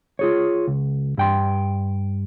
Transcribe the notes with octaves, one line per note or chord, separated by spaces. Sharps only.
F4 G#4 C#5
C#2
G2 G5 C6